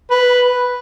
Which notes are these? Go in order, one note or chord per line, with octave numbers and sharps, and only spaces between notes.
B4